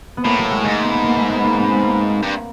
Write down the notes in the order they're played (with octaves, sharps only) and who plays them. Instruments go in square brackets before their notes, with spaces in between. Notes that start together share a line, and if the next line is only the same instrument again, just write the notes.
[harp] B3
[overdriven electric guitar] A2 [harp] A#3
[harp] F#3
G#3
[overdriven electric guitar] G#2 [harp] A3
[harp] B3
B3
A#3
A3
B3
A#3
B3
C4
B3
A#3
[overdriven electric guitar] G2